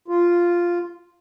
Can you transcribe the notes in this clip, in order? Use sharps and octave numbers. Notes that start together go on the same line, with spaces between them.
F4